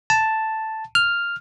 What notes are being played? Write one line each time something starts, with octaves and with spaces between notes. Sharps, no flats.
A5
F6